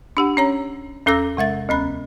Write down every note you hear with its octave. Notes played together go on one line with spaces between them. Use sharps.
D4 G4 F#5
C#4 C#5 A#5
E2 C#4 A4 D6 E6 A#6
C3 G#3 E5 A6
D2 C#4 B5 F#6